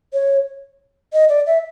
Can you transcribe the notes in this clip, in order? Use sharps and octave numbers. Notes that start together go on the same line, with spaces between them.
C#5
D#5
D5
E5